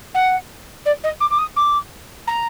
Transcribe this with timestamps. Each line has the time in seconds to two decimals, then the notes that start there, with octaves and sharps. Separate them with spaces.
0.14 F#5
0.85 D5
1.03 D#5
1.20 D6
1.30 D6
1.38 D#6
1.56 D6
2.27 A#5